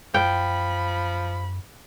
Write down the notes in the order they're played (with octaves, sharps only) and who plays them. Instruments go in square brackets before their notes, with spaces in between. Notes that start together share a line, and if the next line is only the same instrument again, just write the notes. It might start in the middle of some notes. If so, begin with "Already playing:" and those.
[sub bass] F#2 [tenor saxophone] F3 [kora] G5 [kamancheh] B5